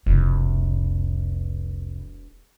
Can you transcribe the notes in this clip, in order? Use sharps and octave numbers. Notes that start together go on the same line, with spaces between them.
E1 C2 F2